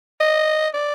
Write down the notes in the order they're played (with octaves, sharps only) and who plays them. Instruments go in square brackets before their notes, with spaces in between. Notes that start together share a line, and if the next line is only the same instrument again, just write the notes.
[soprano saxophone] D#5
D5